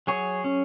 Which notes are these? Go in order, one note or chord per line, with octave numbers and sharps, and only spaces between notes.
F#3 G#4 C#5
C#4